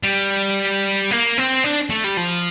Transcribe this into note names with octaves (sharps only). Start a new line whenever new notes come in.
G3
A#3
C4
D4
A3
G3
F3